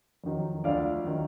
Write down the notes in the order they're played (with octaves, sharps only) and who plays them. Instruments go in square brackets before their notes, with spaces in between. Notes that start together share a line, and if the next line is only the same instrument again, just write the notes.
[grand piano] F2 D#3 F#3
D2 D3 F3 D5 F5
D#3 F#3